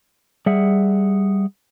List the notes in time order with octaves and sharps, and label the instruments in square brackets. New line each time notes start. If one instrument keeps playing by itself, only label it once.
[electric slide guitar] G3 G#4 E5 F#5